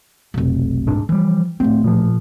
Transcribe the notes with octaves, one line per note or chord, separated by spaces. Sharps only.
F1 B1
D#1 G#2 D4
E3 F3 G3
A1 A3 C4
A#2 F3